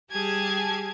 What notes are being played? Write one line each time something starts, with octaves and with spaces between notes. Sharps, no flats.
G3 G4 G#4 G#5 A5 G#6